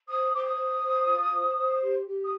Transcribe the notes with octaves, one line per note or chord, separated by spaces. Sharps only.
C5 D#6
C5 D6
D#6
C5
C5
F4
C5
C5
G4
G4
D#6